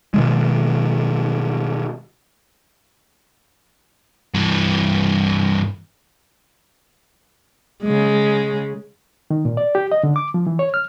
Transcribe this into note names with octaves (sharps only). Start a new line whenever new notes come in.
B2 D#3 G#3
G2 E3
C#3 G#3
D#3
A#2
D5
G4
D#5
D3
D6
F3
E3
C#5
F6